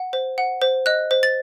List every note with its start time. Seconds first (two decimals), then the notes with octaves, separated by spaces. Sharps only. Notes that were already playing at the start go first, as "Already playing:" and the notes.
Already playing: F#5
0.13 C5
0.38 F#5
0.62 C5
0.86 D#5 F#6
1.11 C5
1.23 A6